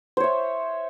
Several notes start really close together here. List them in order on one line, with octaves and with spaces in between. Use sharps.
C5 C#5 E5